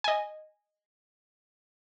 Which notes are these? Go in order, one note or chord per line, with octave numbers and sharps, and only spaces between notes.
D#5 G#5